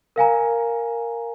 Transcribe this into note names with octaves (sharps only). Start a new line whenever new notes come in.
A#4 F5 G#5 A#5